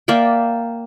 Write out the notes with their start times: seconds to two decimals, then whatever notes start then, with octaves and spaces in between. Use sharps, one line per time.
0.08 A#3 D5 E5 G5